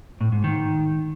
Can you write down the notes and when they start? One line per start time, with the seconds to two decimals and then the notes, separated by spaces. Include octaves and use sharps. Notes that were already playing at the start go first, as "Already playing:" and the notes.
0.21 A2
0.32 G#2
0.44 D#3